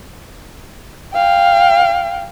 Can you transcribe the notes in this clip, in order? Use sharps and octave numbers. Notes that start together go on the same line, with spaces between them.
F5 G5